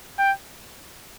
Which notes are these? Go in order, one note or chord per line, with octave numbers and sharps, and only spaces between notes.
G5